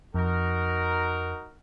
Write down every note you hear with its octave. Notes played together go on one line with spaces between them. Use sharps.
F2 D#4 F#4 A#4